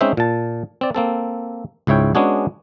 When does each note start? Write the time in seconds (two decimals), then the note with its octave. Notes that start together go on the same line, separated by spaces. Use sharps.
0.01 G#3 C4 C#4 D#4 C5 E5
0.17 A#2 A5
0.81 C4 D5
0.95 A#3 C4 A4
1.87 C#2 G#2 E4 C#5 G5
2.15 G#3 B3 C#4 D4 F#4 G#4